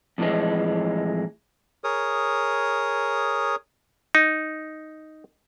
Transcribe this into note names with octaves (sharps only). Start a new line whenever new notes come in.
F2 A2 D#3 E3 G#3
G#4 A#4 C#5 D#6
D#4